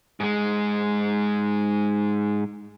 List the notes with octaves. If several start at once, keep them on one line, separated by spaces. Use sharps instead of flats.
G#2 G#3